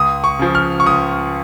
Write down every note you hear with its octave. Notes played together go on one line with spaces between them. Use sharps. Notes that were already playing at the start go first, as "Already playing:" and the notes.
Already playing: C#2 D#6
C#6
C#3 F3
F6
C#6
C#2 D#6